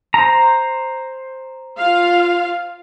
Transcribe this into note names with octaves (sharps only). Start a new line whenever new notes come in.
C5 A#5
F4 F5